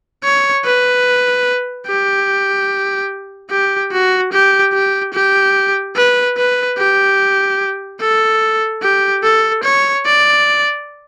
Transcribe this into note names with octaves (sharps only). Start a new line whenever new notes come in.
C#5
B4
G4
G4
F#4
G4
G4
G4
B4
B4
G4
A4
G4
A4
C#5
D5